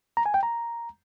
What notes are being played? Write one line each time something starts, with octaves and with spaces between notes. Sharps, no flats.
A#5
G#5
G5
A#5